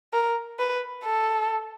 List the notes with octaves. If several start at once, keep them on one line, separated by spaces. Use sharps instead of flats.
A#4
B4
A4